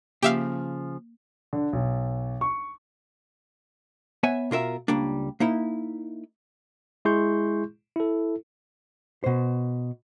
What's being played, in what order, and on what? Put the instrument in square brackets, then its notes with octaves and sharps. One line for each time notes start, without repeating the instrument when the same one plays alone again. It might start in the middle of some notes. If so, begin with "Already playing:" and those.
[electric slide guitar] C#3 F3 [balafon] A#3 [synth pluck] G4 E5 F5
[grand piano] D3
B1
C#6
[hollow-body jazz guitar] B3 C#5 E5 G#5
B2 F4 A#4 E5
C#2 G3 A#3 D4
A#3 D#4 E4
[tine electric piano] G#3 E4 G#4 C6 C#6 G6
E4 A4
[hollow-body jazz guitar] B2 C5